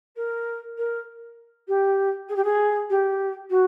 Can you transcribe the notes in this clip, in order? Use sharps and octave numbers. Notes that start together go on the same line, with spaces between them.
A#4
A#4
G4
G#4
G4
G#4
G4
F#4